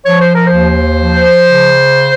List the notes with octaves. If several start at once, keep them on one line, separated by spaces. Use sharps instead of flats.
F3 C#5
C5
A#4
C5
D#2
F3
C#3